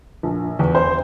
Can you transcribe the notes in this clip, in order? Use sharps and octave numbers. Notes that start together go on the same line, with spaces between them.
A#1
E2
C5